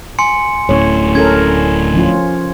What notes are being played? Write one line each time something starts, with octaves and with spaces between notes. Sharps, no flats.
G#5 C6 C#7
D1 A2 C#4 C#5
C#4 A4 A#4 G#6
F3 C#4 F4